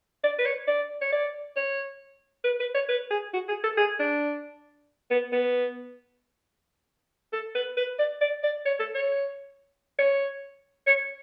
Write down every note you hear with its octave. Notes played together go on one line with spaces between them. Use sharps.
D5
B4
C#5
D5
C#5
D5
C#5
B4
B4
C#5
B4
G#4
F#4
G#4
A4
G#4
D4
B3
B3
A4
B4
B4
D5
D5
D5
C#5
A4
C#5
C#5
C#5